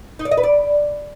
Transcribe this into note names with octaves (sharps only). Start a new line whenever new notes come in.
D#4
D5
D#5
B4
D5